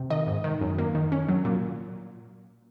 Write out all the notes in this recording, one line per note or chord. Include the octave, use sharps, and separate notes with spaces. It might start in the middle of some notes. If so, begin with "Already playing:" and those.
Already playing: C3
D#3 D#5
G#2
D#3
F#2
A#3
D#3
C#4
F#3
A#2